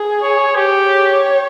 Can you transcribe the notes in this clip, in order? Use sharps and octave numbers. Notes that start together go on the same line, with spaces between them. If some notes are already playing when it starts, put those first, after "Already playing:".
Already playing: G#4
C#5
G4
C#5